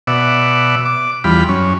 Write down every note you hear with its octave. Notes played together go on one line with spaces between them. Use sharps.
B2 D5 E5 F#5
D6
E2 G3 F4 B5
F#2 C#4